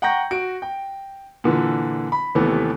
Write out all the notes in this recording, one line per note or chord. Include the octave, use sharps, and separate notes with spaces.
F#5 G5 A#5 C#6 G6 A#6
F#4 D7
G5
A#2 D3 E3
B5
D#2 C3 E3 A3 B3